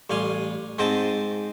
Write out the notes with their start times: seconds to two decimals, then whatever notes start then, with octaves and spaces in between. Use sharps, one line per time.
0.10 A1 G3 F5 G#5 C6
0.79 G#2 C4 C5 D#5 G5 A5